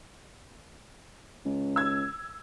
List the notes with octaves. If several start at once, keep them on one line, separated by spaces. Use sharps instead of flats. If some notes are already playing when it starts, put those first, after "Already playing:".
C#2
E6 G#6